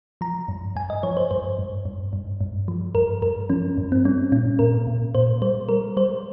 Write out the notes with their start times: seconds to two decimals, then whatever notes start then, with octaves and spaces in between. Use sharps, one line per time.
0.21 F3 A#5
0.48 G2
0.76 G2 G#5
0.90 D#5
1.03 F3 C#5
1.17 C5
1.31 G2 C5
1.59 G2
1.85 G2
2.13 G2
2.41 G2
2.68 F3
2.95 G2 A#4
3.22 G2 A#4
3.50 F3 C#4
3.78 G2
3.92 C4
4.05 G3 C#4
4.32 A#2 C#4
4.59 A#2 A#4
4.87 A#2
5.15 A#2 C5
5.42 G3 C5
5.69 G3 A#4
5.97 G3 C5